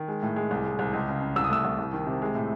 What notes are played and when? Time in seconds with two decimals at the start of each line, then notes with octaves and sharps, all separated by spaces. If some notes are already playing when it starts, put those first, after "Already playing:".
Already playing: D#3
0.08 G#3
0.22 A2
0.36 G#3
0.51 C2
0.64 G#3
0.79 C2
0.93 C#2
1.08 C#3
1.21 C#3
1.36 C2 E6
1.44 D#6
1.49 A3 E6
1.65 C2
1.79 C2
1.93 D#3
2.07 C3
2.22 G#3
2.35 A2